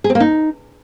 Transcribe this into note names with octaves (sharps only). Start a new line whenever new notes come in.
G#4
C4
A#3
D#4